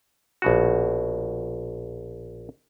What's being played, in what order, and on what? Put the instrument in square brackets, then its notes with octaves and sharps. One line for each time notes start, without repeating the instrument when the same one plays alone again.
[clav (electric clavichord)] A#1 B2 F#4